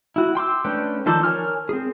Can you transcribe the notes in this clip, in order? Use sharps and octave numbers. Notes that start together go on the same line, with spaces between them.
E4 F#4
G5 C6 D6 E6
A3 C#4 D4 B4 G5
D#3 F3 A4 C5 D5
A#4 C#5 G#5 F6
C4 G#4